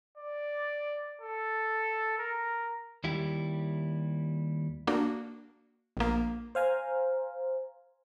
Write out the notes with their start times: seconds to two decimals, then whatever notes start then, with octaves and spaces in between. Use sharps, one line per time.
0.17 D5
1.21 A4
2.18 A#4
3.04 D#2 G3 E4 G4
4.87 A#3 D4 F#4
5.97 A#1 A#3
6.55 C5 F5 G#5 A#5